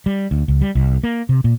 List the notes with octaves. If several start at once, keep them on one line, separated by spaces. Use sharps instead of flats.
G3
D2
C#2
G3
C2
A#3
C3
A#2